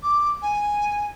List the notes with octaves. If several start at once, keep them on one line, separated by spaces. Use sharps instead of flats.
D6
G#5